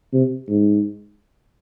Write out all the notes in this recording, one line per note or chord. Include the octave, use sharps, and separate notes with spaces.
C3
G#2